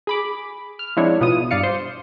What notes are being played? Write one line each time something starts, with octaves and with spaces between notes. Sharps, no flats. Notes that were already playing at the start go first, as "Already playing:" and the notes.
G#4 B5 D6
F6
F3 G#3 C4 D4 E4 C#5
A1 B2 B3 F4 D#6 D#7
G2 D5 F5 C#7
C5 C6